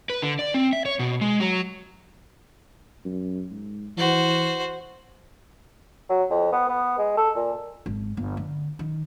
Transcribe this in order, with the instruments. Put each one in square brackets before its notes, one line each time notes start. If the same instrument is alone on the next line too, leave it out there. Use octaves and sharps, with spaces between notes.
[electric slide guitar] B4
D3
D5
C4
E5
C#5
B2
G#3
F#3
[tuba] F#2
G#2
[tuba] E3 [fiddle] F#4 C5
[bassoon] F#3
F2
B3
B3
G#3
A4
A#2
[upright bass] G#1
G1
D3
D#3